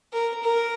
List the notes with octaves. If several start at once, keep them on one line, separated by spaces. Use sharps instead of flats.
A#4
A#4